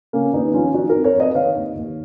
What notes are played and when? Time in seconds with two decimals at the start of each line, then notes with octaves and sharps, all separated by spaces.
0.13 C#3 A#3 C#4
0.33 D#2 B3 D#4
0.54 F3 C#4 F4
0.74 F3 D#4 F#4
0.89 F2 F#4 A#4
1.04 A#4 C#5
1.15 F2
1.20 B4 D#5
1.35 D#3 C#5 F5
1.55 D#2
1.75 D#2